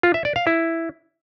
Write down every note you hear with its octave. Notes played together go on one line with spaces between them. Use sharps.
F4
E5
D5
F5
E4